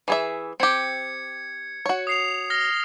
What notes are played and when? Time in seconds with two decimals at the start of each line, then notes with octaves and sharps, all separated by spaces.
0.08 E3 G#4 E5
0.60 C4 G4 G#6 C#7
1.86 F#4 C#5
2.07 D#6 C7 F7
2.50 F6 A#6 G7